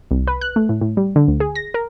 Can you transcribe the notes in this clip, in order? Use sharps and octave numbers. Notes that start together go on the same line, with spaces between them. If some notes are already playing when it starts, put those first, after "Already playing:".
C2
B4
F#6
A3
A2
A2
G3
D3
D2
G#4
A#6
A#4